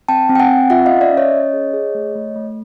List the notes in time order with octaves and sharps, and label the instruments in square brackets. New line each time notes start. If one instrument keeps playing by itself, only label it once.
[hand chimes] C4 G5 A5
C4
G5
F#5 G#5
C4
F4 E5 F#5
C#4 D#5 F5
D5 E5
C#4 C#5 D#5
C#4
G#4
G#4
A3
A3
A3